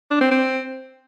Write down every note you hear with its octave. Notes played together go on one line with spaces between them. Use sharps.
D4
C4
C4